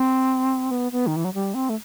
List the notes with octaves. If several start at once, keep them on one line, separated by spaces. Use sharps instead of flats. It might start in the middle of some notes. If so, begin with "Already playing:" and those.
Already playing: C4
B3
B3
D#3
E3
F#3
G3
C4
A3